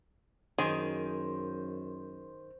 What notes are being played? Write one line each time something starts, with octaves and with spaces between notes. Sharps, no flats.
F#2 D#3 G#4 C5